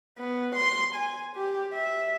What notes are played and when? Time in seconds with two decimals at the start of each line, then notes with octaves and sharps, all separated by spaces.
0.18 B3
0.55 C6
0.95 G#5
1.36 G4
1.73 E5